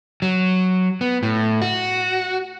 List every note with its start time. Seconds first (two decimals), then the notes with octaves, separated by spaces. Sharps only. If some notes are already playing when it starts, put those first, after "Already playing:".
0.22 F#3
1.01 B3
1.23 A2
1.62 F#4